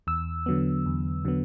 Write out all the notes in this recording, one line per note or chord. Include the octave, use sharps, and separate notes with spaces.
E2 E6
D3 F#3 B3
E2
D3 F#3 B3